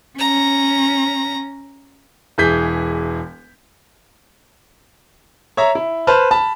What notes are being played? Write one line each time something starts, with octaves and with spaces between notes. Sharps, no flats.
C#4 A#5
E1 E3 G#4 G6 B6
C#5 E5 A#5
E4
B4 C5 A5 F6
A5 B5